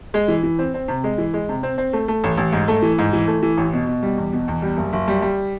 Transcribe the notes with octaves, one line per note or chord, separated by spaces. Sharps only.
G#3
E3
E3
C4
C4
C3
G#3
E3
G#3
C3
C4
C4
A3
A3
A1
A1
G#2
A3
E3
G#2
E3
A3
E3
A1
B2
B2
G3
E2
B2
E2
G3
F#1
F#1
G3
G3